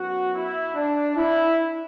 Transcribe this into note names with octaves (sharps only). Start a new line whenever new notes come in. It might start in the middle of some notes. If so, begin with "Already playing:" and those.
Already playing: F#2 F#3 B3 F#4
E4
D4
E4